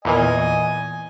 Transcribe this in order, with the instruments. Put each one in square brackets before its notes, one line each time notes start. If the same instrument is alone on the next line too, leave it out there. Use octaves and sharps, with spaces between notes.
[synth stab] E2 A#2 E3 [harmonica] D#5 G#5